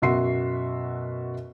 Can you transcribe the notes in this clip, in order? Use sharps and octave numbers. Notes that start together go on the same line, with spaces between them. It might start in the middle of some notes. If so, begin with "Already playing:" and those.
F#2 B2 F#4 E5 C6 C7